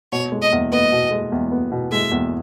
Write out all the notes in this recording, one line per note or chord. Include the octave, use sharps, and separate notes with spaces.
B2 C#5
G#3
D#5
E2
B3 D#5
B2
G#3
E2
B3
B2
G#3 E5
E2